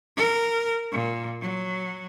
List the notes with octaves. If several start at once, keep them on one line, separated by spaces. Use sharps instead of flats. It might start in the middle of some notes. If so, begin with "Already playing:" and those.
A#4
A#2
F#3